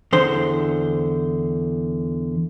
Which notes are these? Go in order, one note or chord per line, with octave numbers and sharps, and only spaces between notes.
E2 D3 C5